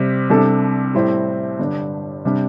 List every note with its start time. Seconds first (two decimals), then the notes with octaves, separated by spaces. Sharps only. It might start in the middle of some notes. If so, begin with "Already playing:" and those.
Already playing: C3 G3 C4
0.29 C2 C3 G3 D4 A4
0.94 A2 G3 C4 E4
1.59 G1 G2 D3 G3 D4
2.25 C3 G3 D4